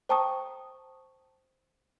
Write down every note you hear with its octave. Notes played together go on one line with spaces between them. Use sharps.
C5 G5 A5 A#5 C#6 D#6